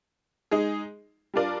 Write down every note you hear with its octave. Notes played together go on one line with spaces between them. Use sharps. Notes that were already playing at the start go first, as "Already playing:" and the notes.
G#3 D#4 G#4
G3 D4 F4 A#4 D5